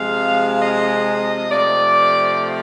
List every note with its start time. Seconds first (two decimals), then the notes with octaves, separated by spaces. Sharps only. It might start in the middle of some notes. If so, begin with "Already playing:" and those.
Already playing: C3 F3 G#3 F5
0.60 D#5
1.50 C3 F3 A3 D5